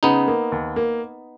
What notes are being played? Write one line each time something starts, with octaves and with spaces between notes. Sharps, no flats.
C#3 B3 D#4
A#3
D#2
A#3